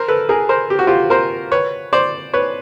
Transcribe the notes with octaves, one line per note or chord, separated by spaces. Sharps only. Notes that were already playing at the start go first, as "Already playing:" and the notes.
Already playing: A#4 C5
A4 B4
G#4 A#4
A#4 C5
G4
F#4
F4 G4
A#4 C5
B4 C#5
C5 D5
B4 C#5